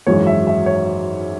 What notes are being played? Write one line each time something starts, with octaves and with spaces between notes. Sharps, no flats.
G#1 F#2 E3 G#3 C#5
E5
E5
C#5